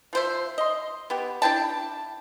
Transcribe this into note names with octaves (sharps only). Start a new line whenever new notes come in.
F3 C5 E5
D#5 C6
B3 G4
D4 E4 G5 A5